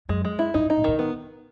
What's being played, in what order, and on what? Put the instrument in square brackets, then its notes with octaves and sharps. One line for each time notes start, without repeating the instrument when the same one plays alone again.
[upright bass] F#2 [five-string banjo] G#3
[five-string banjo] G#3
E4
[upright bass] G2 [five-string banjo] D#4
[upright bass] A2
[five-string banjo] D#4
[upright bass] A2
[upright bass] A#2 [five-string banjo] D#3
[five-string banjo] B3